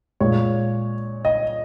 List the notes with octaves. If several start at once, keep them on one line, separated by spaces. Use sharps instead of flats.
A#2 G#3 C#5
D#5